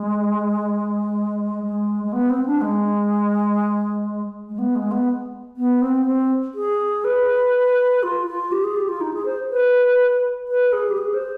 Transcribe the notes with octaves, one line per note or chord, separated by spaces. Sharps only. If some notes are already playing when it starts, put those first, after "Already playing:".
Already playing: G#3
G#3
G#3
B3
C4
D4
G#3
G#3
B3
G#3
B3
B3
C4
C4
G#4
B4
F4
F4
G4
G#4
G4
F4
D#4
G#4
C5
B4
B4
G#4
G4
G#4
C5